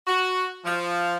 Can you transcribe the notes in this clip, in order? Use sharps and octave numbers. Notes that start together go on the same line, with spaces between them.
F#4
F3